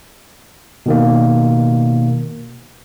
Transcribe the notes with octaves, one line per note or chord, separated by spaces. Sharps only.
B2 D#3 A#3